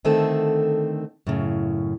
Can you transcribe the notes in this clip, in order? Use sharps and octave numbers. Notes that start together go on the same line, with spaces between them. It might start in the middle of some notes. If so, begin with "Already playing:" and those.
D3 D#3 A3 C4 A4
F#2 A2 C#3